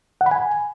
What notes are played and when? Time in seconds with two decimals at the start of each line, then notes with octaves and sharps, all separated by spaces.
0.21 F#5
0.26 B5
0.31 G#5